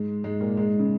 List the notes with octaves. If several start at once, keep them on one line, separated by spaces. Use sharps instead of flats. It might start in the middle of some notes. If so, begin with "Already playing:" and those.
Already playing: G#2 G#3
G#2 G#3
A#2 A#3
G#2 G#3
C#3